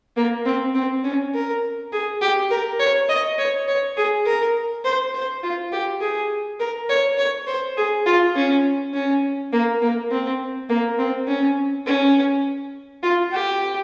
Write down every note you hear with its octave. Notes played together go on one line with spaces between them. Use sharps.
A#3
C4
C4
C#4
A#4
G#4
G4
A#4
C#5
D#5
C#5
C#5
G#4
A#4
C5
C5
F4
G4
G#4
A#4
C#5
C#5
C5
G#4
F4
C#4
C#4
A#3
A#3
C4
A#3
C4
C#4
C#4
F4
G4